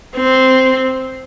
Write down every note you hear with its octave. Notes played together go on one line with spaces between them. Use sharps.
C4